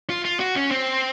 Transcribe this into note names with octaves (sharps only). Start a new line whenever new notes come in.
F4
F4
F#4
C#4
C4